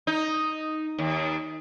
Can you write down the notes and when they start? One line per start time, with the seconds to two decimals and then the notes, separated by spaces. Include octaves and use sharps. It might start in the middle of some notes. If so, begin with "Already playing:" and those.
0.07 D#4
0.98 D#2